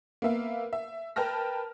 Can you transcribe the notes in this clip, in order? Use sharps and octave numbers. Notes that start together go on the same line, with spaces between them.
A#3 B3 E5 F5
E5
A#4 B4 G5 A5 F6 A#6